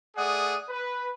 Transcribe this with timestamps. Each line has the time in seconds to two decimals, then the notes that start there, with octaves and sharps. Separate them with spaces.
0.17 A3 G#4 D5 F#5 D#6
0.69 B4